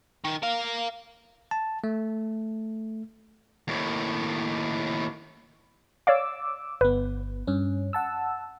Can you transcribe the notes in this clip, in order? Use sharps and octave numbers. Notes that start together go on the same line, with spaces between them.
D#3
A#4 F5
A5
A3
D#2 A2
C#5 D5 F5 D6 E6
G1 B3 B4
G2 C#4
F#5 A5 E6